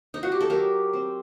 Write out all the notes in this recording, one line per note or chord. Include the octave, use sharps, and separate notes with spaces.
D#4
F#4
G4
A4
F#3 G4 A#4
C4